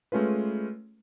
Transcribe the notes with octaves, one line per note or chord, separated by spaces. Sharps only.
G#3 A3 C#4 F4 B4